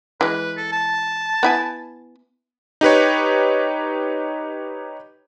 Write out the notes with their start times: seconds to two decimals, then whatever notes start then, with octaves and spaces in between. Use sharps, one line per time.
0.21 E3 G#3 B4
0.57 A4
0.72 A5
1.43 B3 E4 G#5
2.81 D#4 G4 B4 C#5